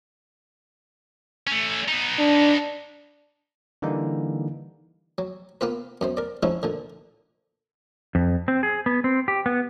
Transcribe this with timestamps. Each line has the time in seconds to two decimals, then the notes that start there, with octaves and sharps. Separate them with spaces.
1.47 A3 C#4
1.88 B3 D#4
2.19 D4
3.82 D3 E3 G3 A#3 D#4
5.18 F#3
5.61 A#3 B3 F4 B4
6.01 F#2 B3 C5
6.17 A#4 D5
6.43 F3 G#3 C#4 D#4 E4
6.63 A#2 D3
8.15 F2
8.48 C4
8.63 G#4
8.86 B3
9.04 C4
9.28 G4
9.46 B3